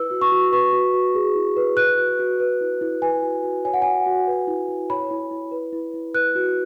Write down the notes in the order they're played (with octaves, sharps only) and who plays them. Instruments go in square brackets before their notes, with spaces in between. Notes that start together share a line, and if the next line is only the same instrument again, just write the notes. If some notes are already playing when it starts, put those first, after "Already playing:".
Already playing: [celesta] E4 B4 E6
F#4
C#6
F#4
B4 C#6
F#4
F#4
G#4
E4
B4
B4 F#6
F#4
F#4
B4
E4
E4
B4 G#5
F#4
F#4
C#5 G#5
F#5
F#4 G#5
F#4
B4
E4
E4
C#5 B5
E4
E4
B4
E4
E4
B4 F#6
F#4